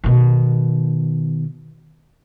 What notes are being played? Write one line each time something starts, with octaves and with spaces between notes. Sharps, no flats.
B2 D#3